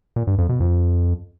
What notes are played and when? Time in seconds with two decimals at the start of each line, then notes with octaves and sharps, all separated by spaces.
0.16 A#2
0.27 G2
0.38 F2
0.49 B2
0.60 F2